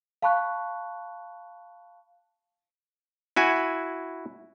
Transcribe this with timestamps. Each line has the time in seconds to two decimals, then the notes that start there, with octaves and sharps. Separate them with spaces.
0.22 F5 A5 B5 C#6 F#6
3.36 E4 F#4 G#5